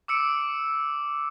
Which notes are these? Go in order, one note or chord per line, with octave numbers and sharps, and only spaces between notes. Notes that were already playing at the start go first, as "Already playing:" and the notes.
D6 E6 C#7 D7